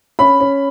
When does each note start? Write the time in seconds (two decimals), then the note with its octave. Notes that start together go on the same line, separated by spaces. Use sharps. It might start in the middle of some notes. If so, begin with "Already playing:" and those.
0.19 C#4 B5
0.40 C#4